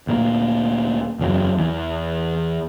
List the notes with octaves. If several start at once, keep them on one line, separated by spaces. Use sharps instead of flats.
D2 A#2 G#3 A#3
F#1 E2 G2 F#3
E2 E3